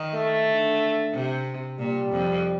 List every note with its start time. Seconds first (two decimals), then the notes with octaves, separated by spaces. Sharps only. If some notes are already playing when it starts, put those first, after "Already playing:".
Already playing: D#3
0.14 A3
0.47 D3
1.13 C3
1.79 A#2 G3
2.12 F2